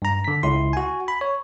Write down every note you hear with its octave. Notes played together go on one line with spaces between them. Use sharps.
G2 A#5
D3 B6
C#2 E4 C6
F#4 G#5
B5
C#5